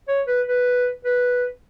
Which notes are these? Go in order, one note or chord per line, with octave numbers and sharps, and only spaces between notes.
C#5
B4
B4
B4